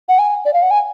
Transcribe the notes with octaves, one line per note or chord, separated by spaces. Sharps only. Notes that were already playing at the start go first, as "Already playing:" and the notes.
F#5
G#5
D5
F5
F#5
G#5